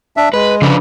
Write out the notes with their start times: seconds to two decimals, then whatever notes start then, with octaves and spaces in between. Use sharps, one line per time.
0.17 D4 E5
0.34 G#3 B4
0.62 C#3 F3 D4 B4